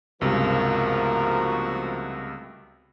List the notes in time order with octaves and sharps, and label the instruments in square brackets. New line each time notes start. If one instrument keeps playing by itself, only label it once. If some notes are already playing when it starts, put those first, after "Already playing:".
[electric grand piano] C#2 G2 C3 [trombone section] F3 A#4 [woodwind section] A3 B3 F#4